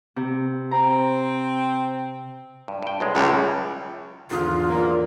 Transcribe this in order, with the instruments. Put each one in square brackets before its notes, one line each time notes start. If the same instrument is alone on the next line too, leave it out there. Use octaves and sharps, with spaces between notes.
[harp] C3
[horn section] C4 [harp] A#5
[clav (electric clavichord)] G2
G2 G5
B1 F#2 G#3
[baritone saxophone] C#2 [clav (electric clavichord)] F#2 A2 G3
[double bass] E2 [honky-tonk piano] G#2 D3 D#6 [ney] F4
[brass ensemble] B1 A#2 A#3